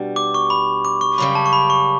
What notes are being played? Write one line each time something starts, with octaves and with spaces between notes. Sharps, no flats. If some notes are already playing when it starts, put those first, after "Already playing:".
Already playing: B2 G3 D4
D6
C#6
B5
D6
C#6
F#2 C#3 G3 B5
A5
C#6
B5
C#6